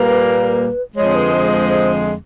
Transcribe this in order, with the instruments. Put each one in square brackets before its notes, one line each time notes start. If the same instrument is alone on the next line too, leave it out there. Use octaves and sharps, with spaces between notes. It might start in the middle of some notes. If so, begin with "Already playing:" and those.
Already playing: [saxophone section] A#2 G3 A#3 [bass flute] B4
[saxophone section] F2 D3 F3 G#3 [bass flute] C#5
[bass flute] B4
C5
C5
C5